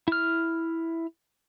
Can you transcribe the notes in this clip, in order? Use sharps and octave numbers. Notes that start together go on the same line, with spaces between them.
E4 F6